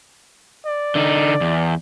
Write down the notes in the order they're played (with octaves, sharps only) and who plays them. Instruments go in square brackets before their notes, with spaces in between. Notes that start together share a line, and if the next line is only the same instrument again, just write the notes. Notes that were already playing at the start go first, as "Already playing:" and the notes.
[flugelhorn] D5
[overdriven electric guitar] D3 D#4
E2